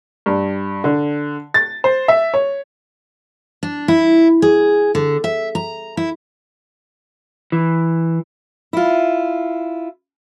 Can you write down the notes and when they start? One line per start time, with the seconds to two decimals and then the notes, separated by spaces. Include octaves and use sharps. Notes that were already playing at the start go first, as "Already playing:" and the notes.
0.26 G2
0.84 D3
1.54 A6
1.84 C5
2.08 E5
2.34 C#5
3.63 D4
3.88 E4
4.42 G#4
4.95 D3
5.24 E5
5.55 A#5
5.97 E4
7.52 E3
8.73 E4 F4